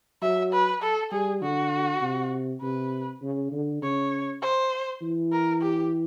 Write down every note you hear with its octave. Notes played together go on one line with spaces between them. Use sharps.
F#3 E5
B4
A4
G3 G#4
D3 F#4
C3
C3 B4
C#3
D3
C#3 C#5
C5
E3
A#4
G4